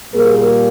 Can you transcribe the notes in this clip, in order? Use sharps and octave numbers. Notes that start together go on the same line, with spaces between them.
A#2 G3 A#3 G#4 A#4